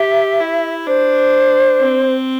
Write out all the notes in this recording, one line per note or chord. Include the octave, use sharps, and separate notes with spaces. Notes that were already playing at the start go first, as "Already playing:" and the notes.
Already playing: G4 E5
E4
D4 C5
C4